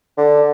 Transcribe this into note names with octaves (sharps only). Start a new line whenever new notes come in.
D3